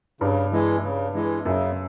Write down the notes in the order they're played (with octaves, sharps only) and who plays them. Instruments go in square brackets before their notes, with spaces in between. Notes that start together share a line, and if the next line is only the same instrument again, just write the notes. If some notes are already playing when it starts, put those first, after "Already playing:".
[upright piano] G2 [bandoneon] C#3
[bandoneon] E3 G#3
C#3
E3 G#3
[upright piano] F#2 [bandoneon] C#3